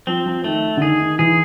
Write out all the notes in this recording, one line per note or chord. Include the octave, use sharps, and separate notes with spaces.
F3 C4
F3
D#3 A3
D3
D#3 G#4
D#3
E3 G#4